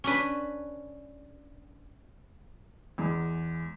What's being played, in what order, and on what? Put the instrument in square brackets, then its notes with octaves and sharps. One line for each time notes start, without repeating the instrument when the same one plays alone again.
[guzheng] C#4 D4 B4
[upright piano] E2 G#3